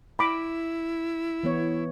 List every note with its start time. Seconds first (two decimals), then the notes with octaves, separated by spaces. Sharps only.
0.19 E4 B5 D6
1.43 E3 B3 C#5